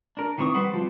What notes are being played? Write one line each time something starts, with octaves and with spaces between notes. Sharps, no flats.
D4 A#4
D#3 E3 C4 C#6 D#6
G3 B4 C5 F#5
F3 G3 C4